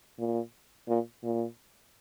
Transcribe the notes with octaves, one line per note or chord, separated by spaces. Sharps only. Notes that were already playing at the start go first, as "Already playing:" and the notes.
A#2
A#2
A#2